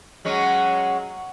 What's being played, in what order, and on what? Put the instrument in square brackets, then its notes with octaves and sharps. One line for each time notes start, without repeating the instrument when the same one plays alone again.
[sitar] F#3 G#3 C#4